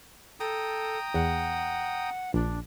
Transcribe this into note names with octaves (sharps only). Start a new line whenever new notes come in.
A4 G5 A#5 D#6
E2 F#5
A#1 D4